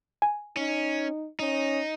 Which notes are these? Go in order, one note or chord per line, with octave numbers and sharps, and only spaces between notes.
G#5
C#4 D#4
C#4 D#4